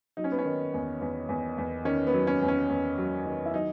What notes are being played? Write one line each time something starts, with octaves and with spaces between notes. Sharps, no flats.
F#3 D#4
C#4
B3
C#4
D#3
E2
E2
E2
E2
D#3 C#4
B3
F#3
C#4
E2
C#4
E2
F#3
D#3
E4
F#3 D#4